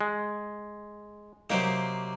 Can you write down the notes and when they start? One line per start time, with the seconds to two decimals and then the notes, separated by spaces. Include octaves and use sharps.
0.01 G#3
1.50 C3 F#3 A#3 D#4 G4 C5